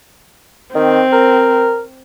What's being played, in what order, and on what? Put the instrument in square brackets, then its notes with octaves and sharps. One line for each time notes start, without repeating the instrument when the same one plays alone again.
[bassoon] D#3 [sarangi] C4
[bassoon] A#4